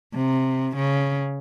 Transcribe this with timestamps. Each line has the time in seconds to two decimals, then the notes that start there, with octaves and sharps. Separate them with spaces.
0.13 C3
0.76 C#3